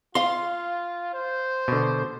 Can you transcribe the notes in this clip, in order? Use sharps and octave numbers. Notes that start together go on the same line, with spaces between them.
F4 F5 C6
C5
B2 D3